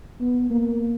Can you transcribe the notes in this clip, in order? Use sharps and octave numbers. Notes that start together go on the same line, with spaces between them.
B3
A#3